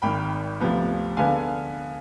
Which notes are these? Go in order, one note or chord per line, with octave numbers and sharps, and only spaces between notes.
G#1 G#2 D#3 G5 B5
D2 C3 F3 B3
D3 G#3 B3 F5 G#5